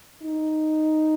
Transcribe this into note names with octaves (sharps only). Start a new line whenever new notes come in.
D#4